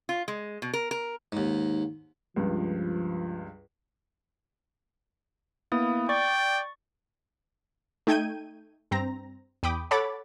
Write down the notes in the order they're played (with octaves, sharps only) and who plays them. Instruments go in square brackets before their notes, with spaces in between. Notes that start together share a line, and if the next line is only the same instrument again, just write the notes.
[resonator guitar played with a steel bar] F4
G#3
B2
A#4
A#4
[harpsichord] D#2 G#2
[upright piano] C#2 G2 [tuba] F3
[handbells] A#3 E4 D#6 [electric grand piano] B3
[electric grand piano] D5 [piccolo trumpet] G5 [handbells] C#6 A6
[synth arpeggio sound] A3 D#4 G5 G6 G#6 D#7
G2 C4 A#5 A#6
E2 G5 B5 D6 D#6
A4 C#5 F#5 B5 D6 A6